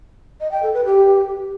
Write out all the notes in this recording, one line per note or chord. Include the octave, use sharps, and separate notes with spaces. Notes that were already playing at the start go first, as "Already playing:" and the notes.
D#5
G5
A4
B4
G4